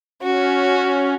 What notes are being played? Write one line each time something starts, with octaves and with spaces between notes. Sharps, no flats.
C#4 F#4